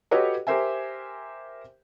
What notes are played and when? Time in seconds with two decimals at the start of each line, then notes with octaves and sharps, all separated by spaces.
0.11 F#4 G4 A4 B4 C#5 D#5
0.47 G4 A#4 C5 E5 G#5